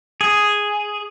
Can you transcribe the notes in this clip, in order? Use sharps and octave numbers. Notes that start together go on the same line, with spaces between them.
G#4